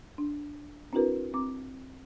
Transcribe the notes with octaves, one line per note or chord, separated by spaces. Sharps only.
D4
C4 D4 E4 F#4 A#4 B4
C4 D6